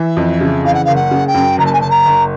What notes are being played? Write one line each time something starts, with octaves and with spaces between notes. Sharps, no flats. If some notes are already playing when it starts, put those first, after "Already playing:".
Already playing: E3 E5
F2
C#3
E3 F5
F#5
F#1 F5
F#5
C#3
G5
F#2
F#1 A#5
A5
G#5
F#1 A5
A#5
F#1